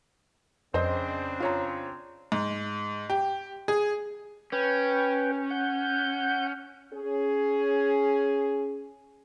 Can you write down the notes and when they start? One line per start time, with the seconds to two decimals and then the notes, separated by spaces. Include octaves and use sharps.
0.74 F2 C#3 C4 D4 C5 D#5
1.40 F4 C#5 A#5
2.32 G#2
3.10 G4
3.68 G#4
4.52 C#4 B4 G5
5.50 F#5 G6
6.92 C#4 G#4